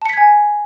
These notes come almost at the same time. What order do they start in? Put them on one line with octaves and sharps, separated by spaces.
A5 C#7 B6 G#6 G#5